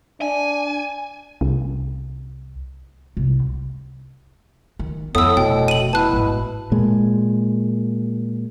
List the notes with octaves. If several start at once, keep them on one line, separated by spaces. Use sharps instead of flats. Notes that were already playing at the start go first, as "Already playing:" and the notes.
D4 G#5
C2
C2
D#3
F2 A2 B3 D#6 E6
F1 B2 G5
D#7 F#7
B2 E4 A5 F#6
A1 G#2
A#2 G#3